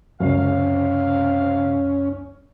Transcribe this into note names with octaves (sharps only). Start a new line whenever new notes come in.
C#2 F#2 C3 C#4 F5